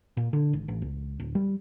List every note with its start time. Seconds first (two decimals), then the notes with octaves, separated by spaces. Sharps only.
0.17 A#2
0.33 D3
0.53 G#1
0.68 A1
0.82 C#2
1.20 D1
1.35 G3